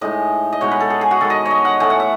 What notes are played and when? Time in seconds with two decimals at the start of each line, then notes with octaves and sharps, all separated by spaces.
0.01 A2 G#3 D#4 D#5
0.53 D#5
0.61 B2 G#3 D#4 C#5
0.71 B4
0.80 A4
0.90 G#4
1.01 G#4
1.11 F#4
1.20 D#3 G#3 B3 A4
1.30 D#5
1.45 C#5
1.50 D#5
1.65 F#5
1.80 A2 E3 A3 G#5
1.90 F#5
2.00 E5